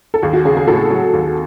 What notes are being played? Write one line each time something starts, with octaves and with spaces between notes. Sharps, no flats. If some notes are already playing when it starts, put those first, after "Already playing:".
A4
D#2 G#4
F#4
C#3 G#4
G#4
A2 F#4 A4
F#3
D#2